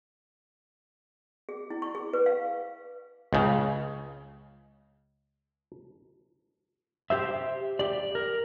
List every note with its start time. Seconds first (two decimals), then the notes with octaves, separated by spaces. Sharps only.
1.49 G#4
1.70 E4
1.82 C#6
1.95 G#4
2.13 B4
2.26 F5
3.33 C#2 C#3
7.10 G4 C5 E5
7.79 G4 D5
8.15 A#4